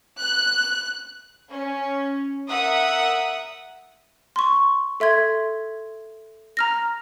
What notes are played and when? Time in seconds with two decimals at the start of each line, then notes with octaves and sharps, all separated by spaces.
0.20 F#6
1.52 C#4
2.49 A#4 E5 F#5 D#6
4.36 C6 C#6
5.00 A4 E5 C6 G#6
6.57 A#5 F6 A#6